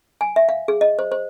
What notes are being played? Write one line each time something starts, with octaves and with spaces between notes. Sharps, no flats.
G#5
E5
F5
G#4
D#5
C5
C5